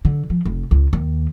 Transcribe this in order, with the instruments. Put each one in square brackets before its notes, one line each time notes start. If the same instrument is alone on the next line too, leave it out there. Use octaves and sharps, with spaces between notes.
[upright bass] D3
F3
F1
C#2
D#2